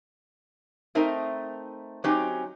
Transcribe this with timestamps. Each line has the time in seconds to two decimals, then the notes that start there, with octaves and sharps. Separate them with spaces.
0.95 A3 C4 D#4 A#4
2.04 F#3 C4 C#4 D#4 G4